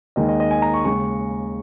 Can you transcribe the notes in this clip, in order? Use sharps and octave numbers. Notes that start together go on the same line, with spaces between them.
D#2 D#3 G#3 D#4 D#5
D#5
D#5
G#5
A#5
C#6
D#2 C#3 G#3 C#6